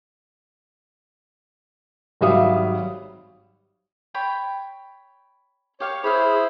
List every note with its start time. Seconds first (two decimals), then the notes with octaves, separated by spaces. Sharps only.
2.21 G#1 F#3 G3 E5 F5 D#6
4.14 C#5 G5 B5
5.80 G4 C#5 F5 C#6
6.04 E4 G#4 C5 C#5 F5 B5